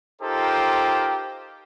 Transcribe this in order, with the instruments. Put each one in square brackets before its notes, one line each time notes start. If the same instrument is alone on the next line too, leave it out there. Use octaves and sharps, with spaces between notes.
[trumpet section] D#4 F4 G4 A4 A#4 C5